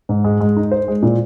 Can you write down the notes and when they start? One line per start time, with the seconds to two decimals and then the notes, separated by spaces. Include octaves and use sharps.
0.09 G#2
0.24 G#3
0.41 G#3
0.57 D#4
0.72 C5
0.88 G#3
1.03 A#2